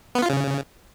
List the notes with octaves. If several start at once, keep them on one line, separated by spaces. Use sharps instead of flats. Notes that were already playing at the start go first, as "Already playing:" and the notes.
B3
F4
C#3